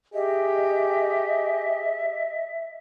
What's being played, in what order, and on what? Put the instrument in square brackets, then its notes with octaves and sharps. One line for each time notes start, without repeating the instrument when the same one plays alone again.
[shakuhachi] G4 [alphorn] G#4 [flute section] D#5 [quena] E5